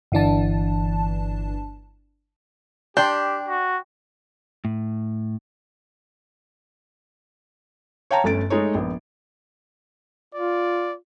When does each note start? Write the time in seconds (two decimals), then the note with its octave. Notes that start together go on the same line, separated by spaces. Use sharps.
0.12 G1 E3 D4 A5
2.97 D4 G4 G5 C6 G6
3.48 F#4
4.65 A2
8.11 C#5 F5 G5 A5 A#5
8.24 G1 A3 C#4 A6 D7
8.50 G#3 A3 D#4 C#5
8.75 A#1 B3
10.34 F4 D5